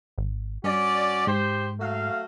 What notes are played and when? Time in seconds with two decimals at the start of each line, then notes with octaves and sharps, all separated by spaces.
0.18 G#1
0.64 G2 C#4 F#4 D5
1.27 G#2 G4 C5
1.79 F#3 A3 F5